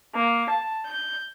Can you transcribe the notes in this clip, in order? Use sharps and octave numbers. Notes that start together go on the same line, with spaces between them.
A#3
A5
G6